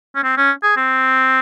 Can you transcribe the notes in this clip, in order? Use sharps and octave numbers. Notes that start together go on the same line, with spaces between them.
C#4
C4
C#4
G#4
C4